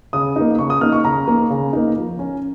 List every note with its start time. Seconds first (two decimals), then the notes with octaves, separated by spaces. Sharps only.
0.13 C#3 D#6
0.36 A#3 D#4
0.59 C#3 C#6
0.70 D#6
0.81 A#3 D#4 F6
0.92 C#6
1.04 C#3 A#5
1.28 A#3 D#4
1.50 C#3
1.73 A#3 D#4
1.96 F3
2.19 C#4